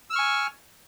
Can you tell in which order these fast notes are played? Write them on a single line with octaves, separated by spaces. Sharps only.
E6 F6 C#6 G#5